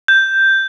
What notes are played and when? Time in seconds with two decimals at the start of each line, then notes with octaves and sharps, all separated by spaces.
0.08 G6